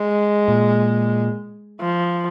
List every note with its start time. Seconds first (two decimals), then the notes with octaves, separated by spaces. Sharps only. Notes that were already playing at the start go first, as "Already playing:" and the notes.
Already playing: G#3
0.48 A#2
1.80 F3